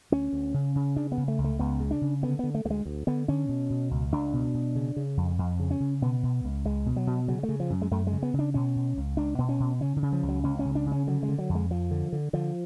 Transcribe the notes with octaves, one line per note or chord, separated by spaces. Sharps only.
D2 C#4
D2
C#3
C#3
C#3 D4
B3
C#3
A3
C#2
A3
C#2 B3
C#3
D4
C#3
D3 B3
D3 B3
A3
D2 A3
G#3
D2
D3 B3
D3 C#4
B2
B2
C#2
C#2 D4
B2
B2
C#3
C#3
F2
F2
C#3
C#4
C#3
B2 B3
B2
C#2
C#2 G#3
B2
F#3
B2
C#3 F#3
A3
C#3
F3
F#2
G#3
F#2 A3
G#3
C#3
B3
C#3
D4
B2 C#4
B2
C#2
C#2 D4
B2 B3
C#4
B2
C#3 C#4
D3
C#3
F3
C#2
F#3
C#2 C#4
C#4
C#3
D4
C#3
C#4
D3 F#3
G#3
D3
F#3
F2
G#3
F2 F3
D3
D3
D3 F3